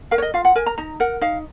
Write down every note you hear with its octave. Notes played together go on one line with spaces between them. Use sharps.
A#4 F5
C#5
D#5
F4 F5
F#5
A#4 G#5
A#5
D#4 A#5
A#4 F#5
D#4 F5